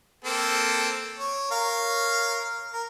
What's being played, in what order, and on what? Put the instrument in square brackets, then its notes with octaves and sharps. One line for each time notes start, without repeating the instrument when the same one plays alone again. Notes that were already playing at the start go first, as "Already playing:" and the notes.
[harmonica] A#3 C4 A4
C#5
A#4 C#5 F5
A#4